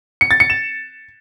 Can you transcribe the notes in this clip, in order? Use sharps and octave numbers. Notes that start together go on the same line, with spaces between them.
C#7
A6
C#7
E7